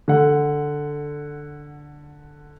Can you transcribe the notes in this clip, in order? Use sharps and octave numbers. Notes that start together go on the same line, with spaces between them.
D3 F#5